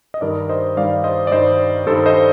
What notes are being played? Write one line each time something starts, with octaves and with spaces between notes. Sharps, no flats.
D#5
G2 D#3 G3 A#4 D5
C5 D#5
G2 D#3 G3 D5 F5
C5 D#5
D5
G2 D#3 G3 C5 D#5
G2 D#3 G3 A4 C5
C5 D#5